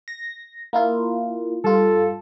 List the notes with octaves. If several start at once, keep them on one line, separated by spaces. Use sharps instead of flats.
A#6
A#3 E4 F4
G2 F4 A4